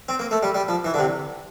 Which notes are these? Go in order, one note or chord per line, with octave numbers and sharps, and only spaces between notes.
C4
A#3
A3
G3
G3
F3
E3
D3
C3